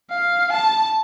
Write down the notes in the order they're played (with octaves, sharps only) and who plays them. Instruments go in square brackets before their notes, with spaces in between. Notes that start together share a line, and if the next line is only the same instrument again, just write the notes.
[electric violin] F5
A5